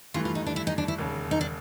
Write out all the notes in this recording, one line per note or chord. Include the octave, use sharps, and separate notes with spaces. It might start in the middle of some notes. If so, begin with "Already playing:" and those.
G2 E3 A3 F4
F4
D#4
D4
E4
D#4
D4
E4
E1 D#2 C#3
D#4
D4